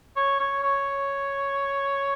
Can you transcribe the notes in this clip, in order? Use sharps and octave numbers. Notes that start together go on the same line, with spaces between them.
C#5
C#5
C#5